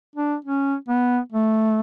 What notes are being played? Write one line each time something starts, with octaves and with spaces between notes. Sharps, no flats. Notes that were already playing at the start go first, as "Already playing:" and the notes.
D4
C#4
B3
A3